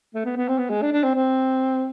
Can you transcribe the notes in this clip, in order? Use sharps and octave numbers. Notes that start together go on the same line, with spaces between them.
A3
B3
B3
C4
B3
G#3
D4
D4
C4
C4